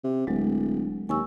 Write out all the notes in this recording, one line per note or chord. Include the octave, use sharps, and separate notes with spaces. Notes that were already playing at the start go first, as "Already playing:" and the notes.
C3
D1 F#3 G#3
D#2 G#5 C#6 E6